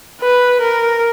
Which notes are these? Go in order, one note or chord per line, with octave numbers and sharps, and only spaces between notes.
B4
A#4